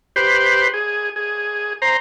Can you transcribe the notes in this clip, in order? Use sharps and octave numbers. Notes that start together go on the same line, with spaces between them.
G4 B4 C5
G#4
G#4
C5 A#5